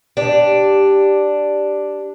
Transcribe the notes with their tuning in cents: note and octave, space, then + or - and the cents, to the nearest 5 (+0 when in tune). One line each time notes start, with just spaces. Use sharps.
D4 +0 G4 +0